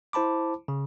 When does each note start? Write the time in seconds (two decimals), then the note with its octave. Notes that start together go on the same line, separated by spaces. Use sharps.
0.13 E4 C5 A5 B5 D6
0.68 C#3